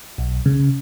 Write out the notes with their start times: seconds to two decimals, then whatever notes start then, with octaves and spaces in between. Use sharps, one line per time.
0.18 B1
0.46 C#3